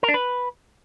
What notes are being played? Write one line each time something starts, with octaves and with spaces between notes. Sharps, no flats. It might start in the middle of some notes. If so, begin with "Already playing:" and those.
A#4
D4
B4